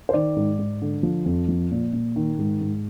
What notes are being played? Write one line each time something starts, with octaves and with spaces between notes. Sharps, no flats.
C5
D#3 D5
G#2
G#2
D3
F3
F2
F3
A#2
A#2
D#3
G#2
G#2